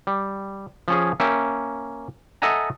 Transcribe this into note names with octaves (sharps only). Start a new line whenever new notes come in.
G3
F3 C#4 G#4
A#3 C#4 E5 G5
A4 D#5 E5 F#5 G#5 A#5